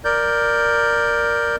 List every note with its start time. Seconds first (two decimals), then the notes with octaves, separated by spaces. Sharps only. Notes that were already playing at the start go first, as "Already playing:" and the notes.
0.05 A#4 D5 G6